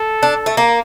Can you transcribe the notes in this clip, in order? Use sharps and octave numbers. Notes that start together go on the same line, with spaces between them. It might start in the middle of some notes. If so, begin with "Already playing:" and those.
Already playing: A4
D4
A3
A#3